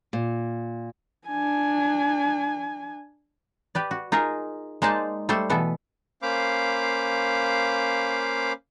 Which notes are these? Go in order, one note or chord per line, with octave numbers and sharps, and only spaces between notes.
A#2
D4 G#5
G4 B4 D5
F#4
D#4 F4 G#4 A#4
G#3 A#3 D#4 C5 D5 A5
G3 A3 A4 C5
B2 E3 B3 A4 E5
A#3 C#4 C5 F5 B5 D6